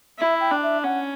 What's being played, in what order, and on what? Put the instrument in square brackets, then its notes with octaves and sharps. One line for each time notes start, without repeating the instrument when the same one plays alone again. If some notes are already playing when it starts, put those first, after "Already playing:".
[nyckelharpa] E4 [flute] E5
[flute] G5
[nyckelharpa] D4
[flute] E5
[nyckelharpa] C#4 [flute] F#5